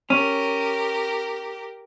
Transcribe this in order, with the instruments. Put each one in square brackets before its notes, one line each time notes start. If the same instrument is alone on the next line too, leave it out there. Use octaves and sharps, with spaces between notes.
[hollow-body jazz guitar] C#4 [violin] G4 A#4